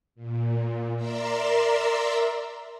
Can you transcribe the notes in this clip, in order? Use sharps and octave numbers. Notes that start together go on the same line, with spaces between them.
A#2
A#4 D5 E5 A#5 C6 E6